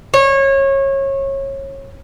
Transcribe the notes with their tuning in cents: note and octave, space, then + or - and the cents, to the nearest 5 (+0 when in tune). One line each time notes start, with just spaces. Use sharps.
C#5 -25